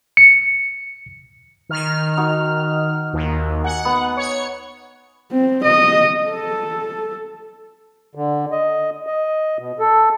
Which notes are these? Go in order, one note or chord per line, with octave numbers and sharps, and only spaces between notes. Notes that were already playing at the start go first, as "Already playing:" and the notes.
C#7
D#3 F6
D#4 F#4
D#2
F#5 G#5
B3
C#5 C#7
C4
D#5
A4
D3
D#5
D#5
B2
A4